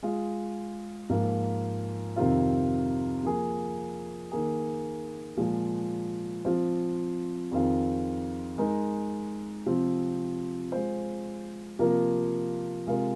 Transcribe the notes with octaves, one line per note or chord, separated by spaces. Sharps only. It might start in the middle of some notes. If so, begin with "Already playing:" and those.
G#3 F4 G#4
G#2 F3 A#3 F4
F2 C3 D#3 C4 F4
F3 A#3 G#4
D#3 A#3 G#4
A#2 F3 G#3
F3 C4 F4 C5
F2 D#3 C4 F4 G#4
G#3 D#4 A#4
C3 F3 C4
G#3 F4 C5
C3 F3 A#3 F4 A#4
C3 G#3 F4 A#4